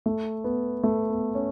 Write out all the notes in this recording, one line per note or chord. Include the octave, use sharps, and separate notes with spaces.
A3
B3
A3
B3
C#4